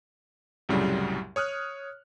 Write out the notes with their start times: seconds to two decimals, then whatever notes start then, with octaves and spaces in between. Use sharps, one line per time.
0.69 C2 F#2 A2 C#3 F#3 G3
1.36 C#5 D#6 F6 F#6